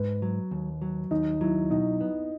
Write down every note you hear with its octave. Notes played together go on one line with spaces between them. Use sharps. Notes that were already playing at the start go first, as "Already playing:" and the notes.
Already playing: G#2 B4
F#3
D#2
F#3
D#2 D#4
F#3 E4
B2 D#4
B3